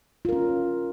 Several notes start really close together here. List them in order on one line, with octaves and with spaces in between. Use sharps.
F4 A#4 C#4